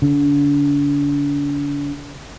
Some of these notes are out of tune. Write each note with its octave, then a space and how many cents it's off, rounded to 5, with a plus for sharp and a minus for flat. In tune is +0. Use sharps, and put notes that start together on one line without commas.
D3 -40